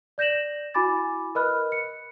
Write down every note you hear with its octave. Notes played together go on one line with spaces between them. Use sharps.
D5 G6 A#6 E7 F#7
E4 F#4 G#5 B5 D6 A6
A#4 B4 D#5 B5 F6 F#6
C#7